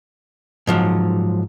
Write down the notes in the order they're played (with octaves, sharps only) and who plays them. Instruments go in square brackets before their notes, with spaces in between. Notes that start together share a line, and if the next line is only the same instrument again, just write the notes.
[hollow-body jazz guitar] G#2 F3 F#3